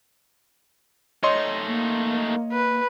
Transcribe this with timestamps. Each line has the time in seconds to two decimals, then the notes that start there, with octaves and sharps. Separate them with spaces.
1.23 A3 D#4 C#5 D#5 C6
1.67 A#3
2.53 B4